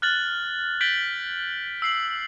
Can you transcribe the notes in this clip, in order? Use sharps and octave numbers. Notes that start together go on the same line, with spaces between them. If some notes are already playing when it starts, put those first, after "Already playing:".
F6 F#6 A6 F#7
G6 A6 B6 D7 F#7 G7
E6 C7 F#7